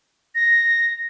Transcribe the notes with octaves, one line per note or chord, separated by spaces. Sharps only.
A#6